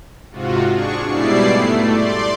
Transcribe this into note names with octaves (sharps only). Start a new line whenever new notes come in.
G#2 C3 F4 F#4
D4 G#4 C#6
G#2 B2 G3 E4 D5 C7
A3
D5 C6